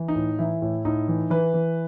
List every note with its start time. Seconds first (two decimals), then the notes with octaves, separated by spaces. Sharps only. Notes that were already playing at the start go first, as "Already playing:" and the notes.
Already playing: E3
0.08 D#4
0.15 A2
0.39 E3 E4
0.62 A2
0.85 A2 D#4
1.08 E3
1.30 E3 B4
1.54 E3